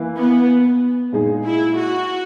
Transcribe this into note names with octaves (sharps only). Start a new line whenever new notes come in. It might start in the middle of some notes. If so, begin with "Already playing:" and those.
Already playing: E3 A#3 E4 B4
B3
A#2 G#3 D#4 G#4
E4
F#4